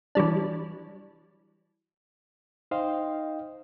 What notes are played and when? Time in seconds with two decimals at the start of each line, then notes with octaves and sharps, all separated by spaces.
0.15 E3 F#3 G3 D4
2.71 D#4 C5 D#5 F5 G5